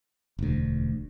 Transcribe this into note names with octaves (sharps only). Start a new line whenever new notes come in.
E1 D2